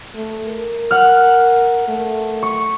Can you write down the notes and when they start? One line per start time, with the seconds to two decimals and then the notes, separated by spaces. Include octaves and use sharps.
0.15 A3
0.46 A#4
0.91 F#5 F6
1.88 A3
2.43 C#6